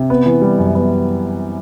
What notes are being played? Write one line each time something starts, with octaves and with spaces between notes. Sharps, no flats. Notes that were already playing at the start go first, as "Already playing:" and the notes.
Already playing: C3
B3
E3
G3
F#2
B3